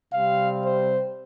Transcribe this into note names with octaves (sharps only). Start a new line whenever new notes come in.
C3 G3 C4 F5
C5